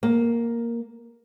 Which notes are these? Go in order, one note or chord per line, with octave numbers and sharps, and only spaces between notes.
A#3